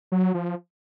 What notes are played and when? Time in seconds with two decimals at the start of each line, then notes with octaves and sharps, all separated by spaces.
0.12 F#3
0.34 F3